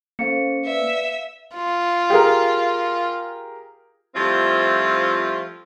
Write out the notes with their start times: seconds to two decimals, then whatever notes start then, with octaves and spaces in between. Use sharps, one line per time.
0.19 A#3 C#4 A4 C5 F5 C#7
0.66 B4 D5 E5
1.55 F4
2.10 G4 G#4 A#4
4.16 F3 G3 A3 C4 E4 F4